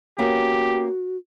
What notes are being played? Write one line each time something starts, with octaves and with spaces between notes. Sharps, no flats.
A#3 B3 C#4 F#4 G4